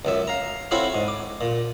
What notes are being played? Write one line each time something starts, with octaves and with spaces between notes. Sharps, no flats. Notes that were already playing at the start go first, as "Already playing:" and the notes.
C#2 F#2 E5
F5 A#5
C4 E4 F#4 A4 C#5 F5
G#2
D6
A#2